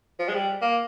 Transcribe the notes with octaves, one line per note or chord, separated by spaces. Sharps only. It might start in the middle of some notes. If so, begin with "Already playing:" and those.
F3
G#3
G3
A#3